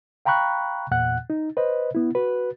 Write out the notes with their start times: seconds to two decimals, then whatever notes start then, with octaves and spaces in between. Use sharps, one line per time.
0.25 F5 G5 A#5 B5 C#6 F#6
0.91 E2 A#2 F#5 F#6
1.30 D#4
1.57 B4 C5 D#5
1.95 B3 E4
2.15 F#4 B4